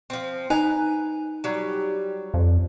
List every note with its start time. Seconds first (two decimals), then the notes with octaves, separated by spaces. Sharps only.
0.10 F3 C4
0.50 D#4 B4 G#5 A#5
1.44 F#3 G3
2.34 F2